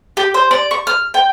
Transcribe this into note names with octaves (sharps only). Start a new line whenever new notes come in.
G4
C5
D5
C#6
F6
G5